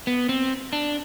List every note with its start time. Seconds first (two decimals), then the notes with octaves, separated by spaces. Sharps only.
0.07 B3
0.29 C4
0.73 D4